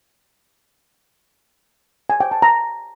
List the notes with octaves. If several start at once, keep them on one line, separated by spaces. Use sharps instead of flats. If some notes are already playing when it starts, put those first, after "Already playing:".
G#5
G5
A5
A#5